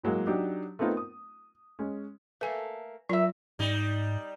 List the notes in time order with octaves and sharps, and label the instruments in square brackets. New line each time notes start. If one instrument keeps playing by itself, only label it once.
[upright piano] A2 F#3 G#3 A#3
F#3 D4 D#4 G4
A3 B3 C4 D#4 F4 A#4
D#6
G#3 C#4
[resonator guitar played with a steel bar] A3 A#3 [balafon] B4 G#5
[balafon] F#3 F4 [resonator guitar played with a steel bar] A#4 E5
[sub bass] G#2 [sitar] G3 D#4